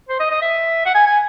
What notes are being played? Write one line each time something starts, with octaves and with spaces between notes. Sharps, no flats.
C5
D#5
D#5
E5
F#5
G#5
G#5